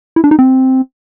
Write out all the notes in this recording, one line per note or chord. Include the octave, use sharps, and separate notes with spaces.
E4
D4
D#4
C4